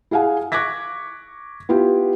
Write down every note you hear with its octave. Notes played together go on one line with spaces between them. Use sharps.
E4 G#4 F5 F#5 G#5
C#6 D6 F#6 G#6 A#6 B6
B3 E4 F4 G4